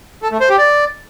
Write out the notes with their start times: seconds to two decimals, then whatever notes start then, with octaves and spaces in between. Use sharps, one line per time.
0.22 A4
0.31 A3
0.40 C5
0.49 G4
0.58 D5